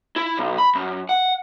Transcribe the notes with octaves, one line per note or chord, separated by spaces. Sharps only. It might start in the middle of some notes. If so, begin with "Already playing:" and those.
E4
B1
B5
F#2
F#5